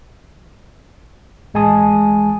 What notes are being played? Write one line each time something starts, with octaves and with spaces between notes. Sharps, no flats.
A1 G#3 G#5 A5 D#6